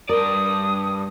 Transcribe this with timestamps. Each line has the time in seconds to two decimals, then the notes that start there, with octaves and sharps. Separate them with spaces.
0.09 G2 A#4 D5 D#6